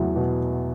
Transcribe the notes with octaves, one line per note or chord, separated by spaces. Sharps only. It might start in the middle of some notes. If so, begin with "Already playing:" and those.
Already playing: E2 F#3
B2